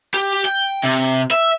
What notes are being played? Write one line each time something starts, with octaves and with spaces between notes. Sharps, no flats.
G4
G5
C3
E5